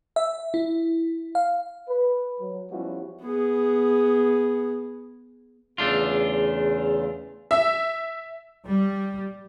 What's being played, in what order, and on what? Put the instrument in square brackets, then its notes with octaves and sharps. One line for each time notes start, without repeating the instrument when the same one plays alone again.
[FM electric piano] E5
E4
F5
[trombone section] B4
F#3
F3 G3 B3 C#4 E4 F#4
[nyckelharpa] B3 G#4
[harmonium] E2 C#3 [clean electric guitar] A3 D4 F4
[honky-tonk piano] E5
[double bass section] G3